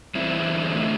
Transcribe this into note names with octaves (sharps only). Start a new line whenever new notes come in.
E2 C4 E4
E2
D3
A2